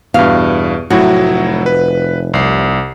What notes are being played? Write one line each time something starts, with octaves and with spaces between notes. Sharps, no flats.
E2 G2 B2 F5
F1 A2 F#3 E4 F#4
B4
C2 C7